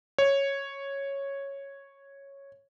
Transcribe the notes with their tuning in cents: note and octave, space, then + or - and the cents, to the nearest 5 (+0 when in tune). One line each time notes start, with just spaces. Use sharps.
C#5 -5